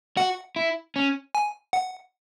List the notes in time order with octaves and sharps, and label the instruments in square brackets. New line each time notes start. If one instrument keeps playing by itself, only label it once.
[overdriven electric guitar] F#4 [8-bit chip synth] F#5
[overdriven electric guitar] E4
C#4
[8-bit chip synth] G#5
F#5